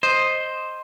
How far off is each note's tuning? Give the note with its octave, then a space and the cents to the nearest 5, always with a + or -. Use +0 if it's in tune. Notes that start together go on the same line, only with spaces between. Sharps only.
C5 +5 D#5 +0